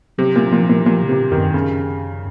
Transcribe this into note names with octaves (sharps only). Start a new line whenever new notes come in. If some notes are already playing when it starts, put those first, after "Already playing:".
C3 F#3
A#2
A#2 F3
A#2
A#2 F3
C#3
C3
A#2
F2 D#3
F#2
C#3